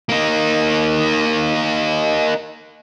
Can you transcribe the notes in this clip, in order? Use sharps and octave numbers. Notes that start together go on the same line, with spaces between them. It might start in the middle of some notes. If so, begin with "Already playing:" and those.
A#3 D#4